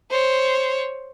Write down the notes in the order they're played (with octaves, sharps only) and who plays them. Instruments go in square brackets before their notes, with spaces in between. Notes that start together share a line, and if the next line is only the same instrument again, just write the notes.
[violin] C5 C#5